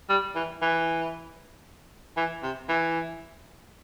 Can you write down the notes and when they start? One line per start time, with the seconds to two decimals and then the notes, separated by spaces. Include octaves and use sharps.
0.09 G3
0.35 E3
0.62 E3
2.17 E3
2.43 C3
2.69 E3